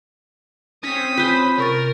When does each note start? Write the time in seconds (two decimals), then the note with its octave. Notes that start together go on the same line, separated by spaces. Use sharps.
0.83 C4 C#4 D#6 B6
1.17 F4 B4 C5
1.58 C3 A#4 C#6 A6